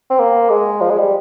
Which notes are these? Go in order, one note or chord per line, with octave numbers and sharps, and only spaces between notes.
C4
A#3
G#3
F3
G#3
G3